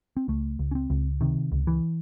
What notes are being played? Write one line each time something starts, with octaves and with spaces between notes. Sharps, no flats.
C4
C#2 A3
C#2
C#4
C4
C#2
C3 D#3
C#2
E3